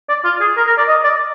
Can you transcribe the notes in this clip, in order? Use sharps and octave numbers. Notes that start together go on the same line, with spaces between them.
D5
F4
G#4
A#4
A#4
D5
D#5
D5